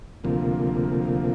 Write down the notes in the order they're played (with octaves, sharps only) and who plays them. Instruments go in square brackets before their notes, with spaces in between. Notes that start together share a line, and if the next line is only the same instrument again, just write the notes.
[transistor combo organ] D2 C3 F3 A#3